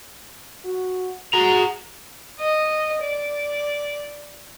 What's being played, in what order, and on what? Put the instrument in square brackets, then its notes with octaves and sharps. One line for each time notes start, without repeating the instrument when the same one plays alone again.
[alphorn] F#4
[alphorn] F#4 [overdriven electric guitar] G#4 A#5
[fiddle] D#5
D5